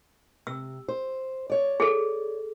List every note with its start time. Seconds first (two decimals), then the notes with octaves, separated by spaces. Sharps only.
0.47 C3 E6
0.88 C5
1.50 C#5 D5
1.80 G#4 A4